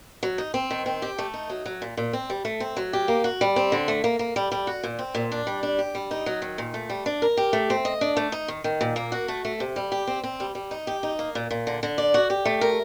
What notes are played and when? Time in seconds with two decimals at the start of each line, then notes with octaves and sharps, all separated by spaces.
0.23 F#3
0.38 D#4
0.54 C4
0.71 D#3
0.86 C4
1.02 G4
1.18 A3
1.34 D#4
1.50 F#3
1.66 F#3
1.82 A#2
1.97 A#2
2.13 C4
2.30 G3
2.45 A3
2.60 C4
2.77 F#3
2.93 G4
3.08 A#3
3.24 F#4
3.41 G3
3.56 C4
3.72 D3
3.88 A3
4.04 A#3
4.19 A#3
4.36 G3
4.52 G3
4.67 F#4
4.83 A#2
4.99 C4
5.15 A#2
5.32 D4
5.47 G3
5.63 D4
5.79 G4
5.95 G3
6.11 D#4
6.26 F#3
6.42 D#3
6.58 A#2
6.74 A3
6.90 G3
7.06 D4
7.22 A#4
7.37 G4
7.53 A3
7.70 C4
7.85 D#5
8.01 D4
8.17 A3
8.32 D#4
8.48 D#3
8.64 D#3
8.81 A#2
8.96 A#3
9.12 F#4
9.28 A3
9.45 A3
9.60 C3
9.76 G3
9.92 G4
10.07 C4
10.24 C4
10.40 G3
10.55 G3
10.71 D#4
10.87 G4
11.03 D#4
11.19 A#3
11.35 A#2
11.51 A#2
11.67 D3
11.83 D3
11.98 D5
12.14 F#4
12.30 G4
12.45 A3
12.61 A#4